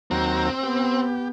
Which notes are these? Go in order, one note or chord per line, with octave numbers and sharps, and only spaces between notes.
D#2 F#3 C4 A#5
B3 G4